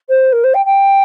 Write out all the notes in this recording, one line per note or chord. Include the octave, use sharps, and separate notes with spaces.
C5
A#4
C5
G5
G5